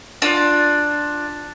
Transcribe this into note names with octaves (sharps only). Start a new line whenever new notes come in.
D4 F4